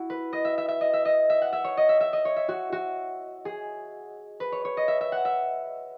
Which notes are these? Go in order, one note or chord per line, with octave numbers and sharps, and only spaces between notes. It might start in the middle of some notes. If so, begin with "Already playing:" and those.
Already playing: E4 F#4
B4
D#5
E5
E5
E5
D#5
E5
D#5
E5
F#5
E5
C#5
D#5
E5
E5
D#5
C#5
E5
F#4
F#4
G#4
B4
C#5
C#5
D#5
E5
E5
F#5
E5